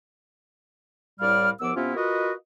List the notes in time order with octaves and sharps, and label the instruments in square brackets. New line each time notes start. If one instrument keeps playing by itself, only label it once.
[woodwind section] C2 A2 G3 D5 F5 F6
D#2 F3 B3 D6 E6
C3 B3 C#4 E4 F4
F4 F#4 A#4 B4 D#5